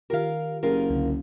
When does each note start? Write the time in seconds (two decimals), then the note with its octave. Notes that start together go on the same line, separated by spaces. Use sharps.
0.10 D#3 F4 G4 A#4 F5
0.63 F#1 F4 G4 G#4 A#4
0.90 C#2 D3